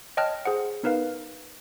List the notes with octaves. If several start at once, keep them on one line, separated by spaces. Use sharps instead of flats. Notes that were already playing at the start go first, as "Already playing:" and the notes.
C#5 D#5 G5 A5 F6 F#6
G#4 C5 F#5
B3 D#4 A#4 B4 F5